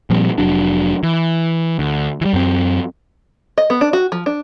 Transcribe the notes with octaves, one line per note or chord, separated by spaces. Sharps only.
A#2 F3 G3 C4
F1 F#3 D4
E3
D2
E3 G3
F#2 C4
D#5
B3
D4
F#4
F3
D4